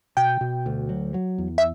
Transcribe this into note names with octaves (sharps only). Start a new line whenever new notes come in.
B2 G5
B2
D2
F#3
F#3
E2
E5